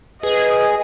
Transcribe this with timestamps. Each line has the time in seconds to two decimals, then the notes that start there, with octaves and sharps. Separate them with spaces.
0.23 G#4 B4 D#5